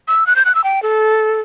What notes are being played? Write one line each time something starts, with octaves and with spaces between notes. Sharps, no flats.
E6
F#6
G6
F#6
E6
G5
A4